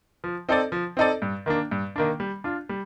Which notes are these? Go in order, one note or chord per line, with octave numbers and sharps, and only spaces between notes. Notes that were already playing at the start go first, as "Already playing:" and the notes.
F3
C4 D#4 A4 D5
F3
C4 D#4 A4 D5
G2
D#3 A#3 D4
G2
D#3 A#3 D4
G3
D4 F4
G3